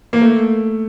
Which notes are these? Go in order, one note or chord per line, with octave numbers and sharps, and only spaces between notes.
A#3
A3